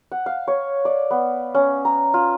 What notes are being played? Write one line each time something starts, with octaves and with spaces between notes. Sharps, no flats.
F#5
F5
C#5
D5
B3
C#4
A#5
F4